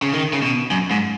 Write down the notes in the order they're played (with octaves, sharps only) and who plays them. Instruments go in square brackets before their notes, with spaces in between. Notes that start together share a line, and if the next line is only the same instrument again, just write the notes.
[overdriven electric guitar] C#3
D#3
C#3
B2
F#2
G#2